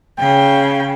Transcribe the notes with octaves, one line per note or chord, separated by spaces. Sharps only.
C#3 G5